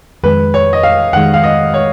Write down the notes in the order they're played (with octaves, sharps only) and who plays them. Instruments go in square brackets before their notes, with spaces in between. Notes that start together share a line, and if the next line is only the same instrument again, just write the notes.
[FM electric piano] F2 D#3 G#3 [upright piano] B4
[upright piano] C#5
D#5
F5
[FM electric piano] F2 D#3 G#3 [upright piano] F#5
[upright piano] F5
D#5
C#5